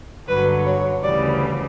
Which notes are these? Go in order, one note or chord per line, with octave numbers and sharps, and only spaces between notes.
G2 D3 F#3 B4
C#5
D2 C#3 E3 G3 D5